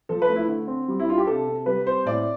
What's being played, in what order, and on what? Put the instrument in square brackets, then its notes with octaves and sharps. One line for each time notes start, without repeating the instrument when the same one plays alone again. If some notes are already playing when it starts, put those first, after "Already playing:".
[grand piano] F3 A4
B4
A3
E4
D3
C4
G3
E4
D4 F4
G4
C3 A4
C3
G3 B4
C4 C5
A2 D5